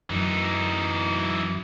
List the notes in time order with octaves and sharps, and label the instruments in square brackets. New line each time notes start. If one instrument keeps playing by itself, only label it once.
[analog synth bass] F#2 [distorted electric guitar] E3 D#4